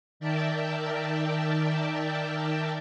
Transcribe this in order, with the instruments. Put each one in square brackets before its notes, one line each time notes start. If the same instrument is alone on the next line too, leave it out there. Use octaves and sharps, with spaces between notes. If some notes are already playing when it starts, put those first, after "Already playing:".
[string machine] D#3 A#4 D5 E5 G5 A5